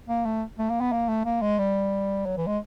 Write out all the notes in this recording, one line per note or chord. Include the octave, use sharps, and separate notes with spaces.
A#3
A3
A3
A#3
B3
A#3
A3
A#3
G#3
G3
F#3
E3
G#3